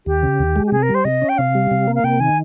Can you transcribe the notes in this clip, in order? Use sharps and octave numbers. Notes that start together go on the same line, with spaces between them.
D#2 G4
C#3
D#2
G#3
G4
C3 G#4
A#4
G3
C5
C3 D#5
C#4
G5
C3 F5
G3
C3
A#3
F5
C3 G5
D#3 G#5